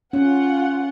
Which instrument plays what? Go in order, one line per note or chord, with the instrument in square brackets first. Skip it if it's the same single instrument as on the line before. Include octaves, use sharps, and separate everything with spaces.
[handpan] C#4 [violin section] F4 F#5